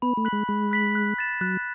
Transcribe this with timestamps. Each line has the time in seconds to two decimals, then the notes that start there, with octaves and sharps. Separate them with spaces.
0.02 B3 B5
0.17 A3
0.25 F#6 B6 F#7
0.33 G#3
0.48 G#3 B5
0.71 F#6 B6 F#7
0.95 F#6
1.18 A6 E7
1.41 F#3 F#6